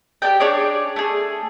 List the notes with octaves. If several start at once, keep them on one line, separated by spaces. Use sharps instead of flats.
G4 A4 D5 G5
D4 G#4 C#5 D5
A3 G#4